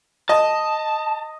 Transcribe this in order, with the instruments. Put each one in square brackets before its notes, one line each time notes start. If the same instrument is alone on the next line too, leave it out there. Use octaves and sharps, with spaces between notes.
[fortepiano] D#5 [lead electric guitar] A5